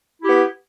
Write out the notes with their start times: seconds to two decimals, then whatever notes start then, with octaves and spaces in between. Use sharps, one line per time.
0.20 E4
0.24 G4
0.28 B3